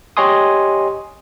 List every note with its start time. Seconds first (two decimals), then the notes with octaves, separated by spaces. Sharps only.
0.17 G4 C#5 D#5 G#5 C6 D#6